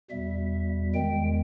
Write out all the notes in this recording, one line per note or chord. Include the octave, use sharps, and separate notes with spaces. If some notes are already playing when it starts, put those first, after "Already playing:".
E2 B2 G3 E5
E2 D#3 G#3 G5